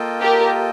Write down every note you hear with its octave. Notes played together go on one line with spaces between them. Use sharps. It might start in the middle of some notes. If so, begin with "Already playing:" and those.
Already playing: A#3 F4 A4 D#5 G5
G4 A#4